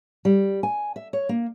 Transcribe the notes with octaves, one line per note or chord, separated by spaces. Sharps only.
G3
G#5
E5
C#5
A#3